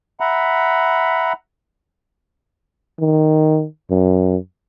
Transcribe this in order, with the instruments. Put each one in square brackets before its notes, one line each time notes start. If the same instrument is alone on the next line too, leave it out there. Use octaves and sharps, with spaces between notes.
[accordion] E5 F#5 A#5 B5
[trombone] D#3
F#2